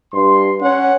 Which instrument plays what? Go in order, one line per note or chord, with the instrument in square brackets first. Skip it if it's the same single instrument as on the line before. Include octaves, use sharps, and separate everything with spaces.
[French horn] G2 [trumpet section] C6
[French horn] C#4 [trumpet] F#5